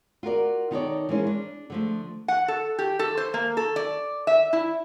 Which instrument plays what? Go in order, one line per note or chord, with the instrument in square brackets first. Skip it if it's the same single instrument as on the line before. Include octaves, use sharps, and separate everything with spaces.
[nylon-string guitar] F4 F#4 A#4 D5
D#3 D#4 A4 A#4 C#5 D5
E3 G#3 A#3 C#4 C5
D4
D3 F3 A3
[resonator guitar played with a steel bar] F#5
A4
G4
A4
C5
A#3
A4
D5
E5
E4